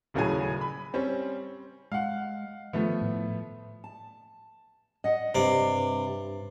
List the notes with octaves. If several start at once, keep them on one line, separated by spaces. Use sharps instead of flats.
D#1 A2 C#3 F#3 G#4 G#5
B5
G3 C4 C#4
G#3 F5 F#5
D#3 F3 A3 B3
A2
A5
D#5 F#5
G2 C3 D5